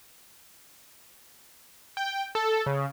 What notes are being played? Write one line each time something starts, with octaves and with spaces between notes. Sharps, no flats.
G5
A4
C#3